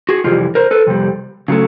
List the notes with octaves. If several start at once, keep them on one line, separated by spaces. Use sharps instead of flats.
F#4 G#4
F2 C3 E3 G3 F4 G4
A#4 C5
A4 B4
F2 C3 G3
C#3 F#3 A3